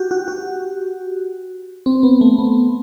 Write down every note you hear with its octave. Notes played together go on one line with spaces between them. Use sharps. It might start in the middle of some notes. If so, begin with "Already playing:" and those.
Already playing: F#4 G4
F#4
F#4
C4
B3
A3
B3